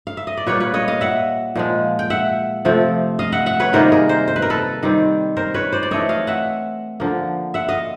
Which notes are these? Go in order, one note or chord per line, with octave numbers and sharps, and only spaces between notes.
F5
E5
D#5
D5
A#2 G3 A#3 B4 C#5
B4 C#5
C#5 D#5
D#5 F5
E5 F#5
A#2 F3 G#3
G5
E5 F#5
C3 F3 A3 C4
D#5 F5
E5 F#5
E5 F#5
B4 C#5
C3 D#3 G3 A#3 A#4 C5
G#4 A#4
A#4 C5
C5
B4
A#4
A4 B4
D#3 G3 C4
A#4 C5
B4 C#5
C5 D5
D5
E3 A3 C4 C#5 D#5
D#5 F5
E5 F#5
D3 F3 A#3
E5 F#5
D#5 F5